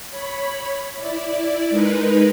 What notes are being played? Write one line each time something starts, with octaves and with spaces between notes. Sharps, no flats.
C#5 B5
E4 D5
G#3 D#4 A#4 B4